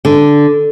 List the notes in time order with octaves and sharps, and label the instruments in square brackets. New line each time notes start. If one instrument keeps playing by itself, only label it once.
[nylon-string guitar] D3